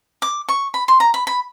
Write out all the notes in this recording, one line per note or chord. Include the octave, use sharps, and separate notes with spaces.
D6
C#6
B5
C6
A#5
B5
B5